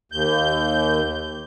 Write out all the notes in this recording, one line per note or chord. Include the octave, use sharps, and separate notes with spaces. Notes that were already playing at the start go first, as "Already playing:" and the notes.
D#2 G6